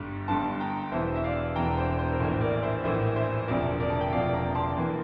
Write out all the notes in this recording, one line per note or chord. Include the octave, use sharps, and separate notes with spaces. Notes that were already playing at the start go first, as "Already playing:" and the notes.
Already playing: G1 G2 D3 G3
G1 G2 D3 G3 A5 C6
G5 A#5
E1 E2 E3 C5 E5
E5
D5 F5
E1 E2 E3 G5 A#5
C5
C5
A#4
A#1 A2 E3 A#3 C5
A#4 D5
C5 E5
A#1 A2 E3 A#3 C5 E5
C5 E5
E1 D2 C3 F3 A#4 D5
A#4 D5
A5
G5
E1 D2 C3 F3 D5 F5
A#5 D6
A5 C6
E2 E3 A#3